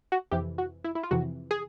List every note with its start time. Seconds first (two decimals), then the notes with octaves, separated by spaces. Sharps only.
0.12 F#4
0.31 F2 C3 E3 G4
0.58 F#4
0.84 E4
0.95 E4
1.03 F4
1.11 F2 C3 E3 F#4
1.51 G#4